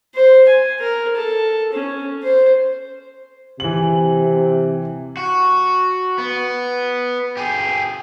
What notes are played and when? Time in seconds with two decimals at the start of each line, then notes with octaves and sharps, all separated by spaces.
0.15 C5
0.48 G#5
0.80 A#4
1.16 A4
1.73 C#4
2.23 C5
3.60 C3 E3 F#7
5.17 F#4
6.18 B3
7.37 G4 G#4